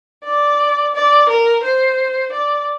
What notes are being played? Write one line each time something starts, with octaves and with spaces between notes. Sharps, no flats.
D5
D5
A#4
C5
D5